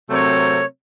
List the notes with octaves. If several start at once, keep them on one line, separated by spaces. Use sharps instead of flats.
C3 F#3 A3 C4 A#4 C#5